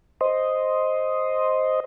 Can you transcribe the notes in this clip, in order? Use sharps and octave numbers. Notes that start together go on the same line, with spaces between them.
C5 D#5